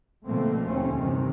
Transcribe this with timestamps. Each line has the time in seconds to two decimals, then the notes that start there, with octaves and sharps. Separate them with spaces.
0.24 B2 D3 F3 A3 A#3 C4
0.64 D#2 C4 C#4
0.95 G2 C3 D#3 E3